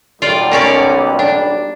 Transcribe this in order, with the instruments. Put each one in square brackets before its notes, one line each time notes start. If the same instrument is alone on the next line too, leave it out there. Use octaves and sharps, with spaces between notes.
[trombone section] B1 G3 [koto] F4 D5
[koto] A#3 C#4 D5
D4